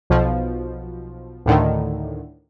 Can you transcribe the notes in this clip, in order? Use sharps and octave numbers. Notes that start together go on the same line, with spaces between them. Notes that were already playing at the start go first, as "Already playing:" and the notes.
B1 B2 F3
D2 A2 D3 D#3